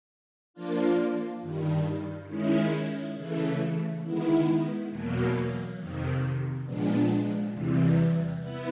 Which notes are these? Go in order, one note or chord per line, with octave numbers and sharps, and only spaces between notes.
F3 A#3 D4 F4
G2 D#3 G3
D#3 G#3 C#4 E4
C#3 E3 A3
D#3 G#3 B3 E4
E2 B2 F#3 A#3
F2 C3 D#3
A#2 F3 G#3 B3 D4
E2 C3 E3 G3
B3 E4